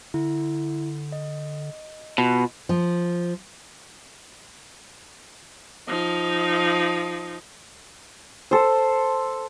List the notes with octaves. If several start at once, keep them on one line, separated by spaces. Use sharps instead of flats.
D3 E4
D#5
B2 F4
F3
F3 D#4
A4 C5